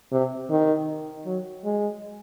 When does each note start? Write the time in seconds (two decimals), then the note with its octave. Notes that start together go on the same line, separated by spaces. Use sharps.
0.12 C3
0.50 D#3
1.26 F#3
1.64 G#3